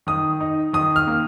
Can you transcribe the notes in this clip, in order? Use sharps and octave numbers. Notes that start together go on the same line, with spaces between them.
D#3 D#6
D#4
D#3 D#6
F6
A#3